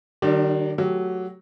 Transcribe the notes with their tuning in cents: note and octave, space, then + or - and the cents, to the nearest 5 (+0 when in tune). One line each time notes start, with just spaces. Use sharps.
D#3 -35 G3 -40 D4 +15
F#3 +0 A3 +0 G4 -10